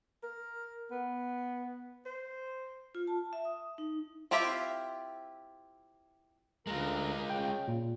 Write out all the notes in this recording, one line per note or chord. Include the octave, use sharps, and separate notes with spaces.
A#4
B3
C5
F4
A5
E5
D#6
D#4
C4 E4 F4 G4 E5
D2 G#3 F4 A#4 A#5
C#3 G5
A#2